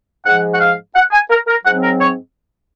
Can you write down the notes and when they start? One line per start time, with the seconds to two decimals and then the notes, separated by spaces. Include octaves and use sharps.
0.24 G#2 F3 G#3 F#5
0.52 F#5
0.59 F5
0.94 F#5
1.12 G#5
1.29 A#4
1.47 A#4
1.65 G#2 F#3 C4 F#5
1.83 A#4
2.00 C#5